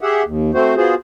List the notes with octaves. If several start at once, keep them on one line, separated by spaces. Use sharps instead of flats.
G4 G#4 E5 F#5
D#2
A3 C4 F#4 C5
B3 F4 F#4 G#4 C5